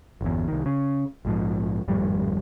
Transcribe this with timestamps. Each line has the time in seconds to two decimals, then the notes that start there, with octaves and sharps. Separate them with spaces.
0.21 G1 E2
0.48 C2 D#3
0.66 C#3
1.25 A#1 G#2 F3
1.88 G#1 F2 A2 G3